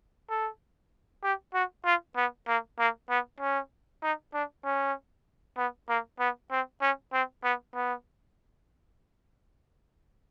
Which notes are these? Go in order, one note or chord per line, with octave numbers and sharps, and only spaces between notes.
A4
G4
F#4
F4
B3
A#3
A#3
B3
C#4
D#4
D4
C#4
B3
A#3
B3
C4
C#4
C4
B3
B3